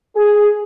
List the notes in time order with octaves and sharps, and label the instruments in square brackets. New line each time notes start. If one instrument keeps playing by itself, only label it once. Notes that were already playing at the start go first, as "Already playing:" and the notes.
[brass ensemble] G#4